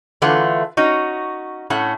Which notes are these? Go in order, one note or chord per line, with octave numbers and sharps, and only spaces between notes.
D3 E3 A3 F4 B4 F#5
C#4 D#4 F#4
A2 A3 C#4 F#5